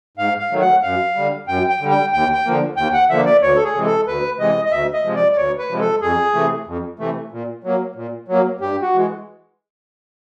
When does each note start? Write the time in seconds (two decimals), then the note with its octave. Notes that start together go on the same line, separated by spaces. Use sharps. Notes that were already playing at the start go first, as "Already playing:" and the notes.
0.17 G#2 F5
0.39 F5
0.51 D#3 F#3 A3
0.61 F#5
0.83 F#2 F5
1.15 D3 G3
1.47 F#2 G5
1.69 G5
1.80 D3 G3
1.91 G5
2.13 D#2 G5
2.34 G5
2.45 D3 F3 A#3
2.77 D#2 G5
2.93 F#5
3.10 D3 F3 A#3 E5
3.26 D5
3.42 D2 C#5
3.56 A4
3.64 G#4
3.75 C3 E3 G#3
3.86 A4
4.07 D2 B4
4.39 C3 E3 G#3 D#5
4.65 D#5
4.71 D2 E5
4.93 D#5
5.04 C3 F3 G#3
5.16 D5
5.32 D5
5.37 D2 C#5
5.58 B4
5.69 C3 F3 G#3
5.80 A4
6.01 F2 G#4
6.34 C3 E3 A3
6.66 F2
6.99 C3 E3 A3
7.32 A#2
7.64 F#3 A#3
7.96 A#2
8.28 F#3 A#3
8.61 G2 G4
8.82 F#4
8.93 E3 G#3